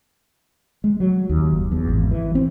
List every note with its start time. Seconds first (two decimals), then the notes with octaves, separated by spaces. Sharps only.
0.84 G#3
1.00 F#3
1.29 D#2
1.52 F#1
1.72 E2
1.88 G#1
2.11 E3
2.35 C4